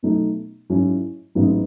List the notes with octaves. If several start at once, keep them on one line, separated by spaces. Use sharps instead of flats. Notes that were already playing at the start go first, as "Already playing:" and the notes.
B2 F#3 A3 D#4
G#2 F#3 C#4 E4
A1 G#2 F#3 B3 D#4